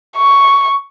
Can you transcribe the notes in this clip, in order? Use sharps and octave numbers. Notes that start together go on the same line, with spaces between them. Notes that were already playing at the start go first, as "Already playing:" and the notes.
C#6